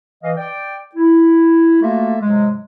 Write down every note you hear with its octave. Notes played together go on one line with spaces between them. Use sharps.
E3 D#5 F5
D5 G5
E4
A3 A#3 F4 F#4 A4 E5
G#2 C3 F#3 G#3